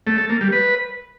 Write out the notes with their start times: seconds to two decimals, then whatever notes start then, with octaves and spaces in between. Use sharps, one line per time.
0.07 A3
0.18 A4
0.29 A#3
0.41 G3
0.52 B4